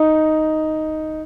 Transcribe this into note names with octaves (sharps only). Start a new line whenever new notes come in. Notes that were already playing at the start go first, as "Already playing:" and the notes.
Already playing: D#4